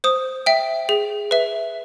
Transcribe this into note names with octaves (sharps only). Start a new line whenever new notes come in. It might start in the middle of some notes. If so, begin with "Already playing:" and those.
C5 D#6
E5 G5
G#4
B4 E5